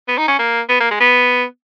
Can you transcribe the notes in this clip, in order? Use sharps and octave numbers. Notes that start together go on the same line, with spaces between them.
B3
D#4
C#4
A#3
B3
A#3
G#3
B3